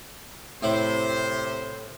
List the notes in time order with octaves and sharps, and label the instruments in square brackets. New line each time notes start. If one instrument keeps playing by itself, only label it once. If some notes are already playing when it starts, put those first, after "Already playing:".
[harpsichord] A2 E4 [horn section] C3 C5